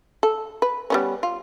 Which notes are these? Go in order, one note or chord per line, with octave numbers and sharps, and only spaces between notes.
A4
B4
G3 B3 C#4
F4